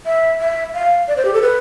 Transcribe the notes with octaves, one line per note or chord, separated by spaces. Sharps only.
E5
E5
F5
D5
C5
G4
A4
B4